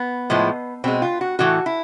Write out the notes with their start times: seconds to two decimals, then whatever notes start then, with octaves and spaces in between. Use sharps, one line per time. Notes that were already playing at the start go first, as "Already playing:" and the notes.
Already playing: B3
0.30 A2 F3 G#3
0.84 B2 G#3 C4
1.02 F4
1.21 F#4
1.39 A2 E3 A3 F#4
1.66 E4